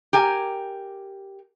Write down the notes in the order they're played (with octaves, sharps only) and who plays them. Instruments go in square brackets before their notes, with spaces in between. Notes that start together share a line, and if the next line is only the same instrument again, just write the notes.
[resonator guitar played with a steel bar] G4 A#4 G#5